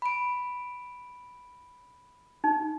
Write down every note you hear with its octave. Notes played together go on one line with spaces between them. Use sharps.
B5 D7
D#4